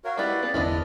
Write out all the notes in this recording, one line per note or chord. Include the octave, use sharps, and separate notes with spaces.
F#4 A#4 C#5 F5
G#3 E4 G4 B4 D5 F#5
B3 G#4 F5
G1 E2 G#3 B3 D4 E4 D#5 F6